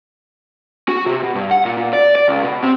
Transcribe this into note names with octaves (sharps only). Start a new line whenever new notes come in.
F#4
C3
B2
G2
F#5
A#2
A#2
D5
D5
C#2
B2
C4